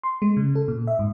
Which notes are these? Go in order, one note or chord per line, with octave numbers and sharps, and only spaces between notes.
C6
G#3
C#3
A4
A#2
E5
G#2